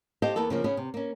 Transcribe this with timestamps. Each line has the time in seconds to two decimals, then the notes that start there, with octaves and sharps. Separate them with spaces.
0.22 G4 A4 C5 D#5 F5 G5
0.36 E2 A#3 B3 A4
0.50 C#3 F3 A#3
0.64 C#3 B3 C#4 G#4
0.77 C3
0.94 A#3 C#4